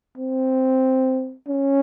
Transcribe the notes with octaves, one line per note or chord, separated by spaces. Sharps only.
C4
C#4